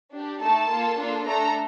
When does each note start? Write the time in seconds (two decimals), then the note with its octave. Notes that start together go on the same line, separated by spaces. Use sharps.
0.13 D4 G4
0.40 A3 D#4 A4 A5
0.69 A#3 F4 A4
0.97 A#3 D4 F4 A4
1.25 A3 D4 A4 A#5